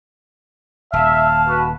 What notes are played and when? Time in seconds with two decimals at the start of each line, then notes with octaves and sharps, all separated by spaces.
0.93 D#1 E5 F5 A5
1.47 F#4 B4